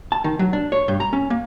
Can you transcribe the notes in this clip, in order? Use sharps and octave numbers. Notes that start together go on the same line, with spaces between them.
A5
D#3
F#3
D4
C#5
G2
A#5
C#4
A#3